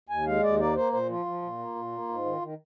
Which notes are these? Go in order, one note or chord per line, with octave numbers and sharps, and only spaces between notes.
D#2 G#5
G#3 F5
D#2 D5
A#3 D5
A#3 C5
A#2 C5
F3 F4
F3
A#2
A#3
A#2
A#3
G#2
D#3
D#3